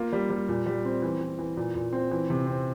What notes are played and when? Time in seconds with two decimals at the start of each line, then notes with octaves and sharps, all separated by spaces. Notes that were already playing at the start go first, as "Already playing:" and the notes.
Already playing: A#3 F4
0.13 G3
0.30 G3
0.49 A#2
0.66 G3
0.85 C4
1.02 E3
1.21 E3
1.39 E3
1.57 A#2
1.75 A#2
1.93 C4
2.11 E3
2.30 C3
2.47 C4